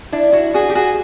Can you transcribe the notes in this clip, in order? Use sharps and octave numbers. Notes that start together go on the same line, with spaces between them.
D4 E4
E4 F#4
F#4 G#4
G4
F#4 G#4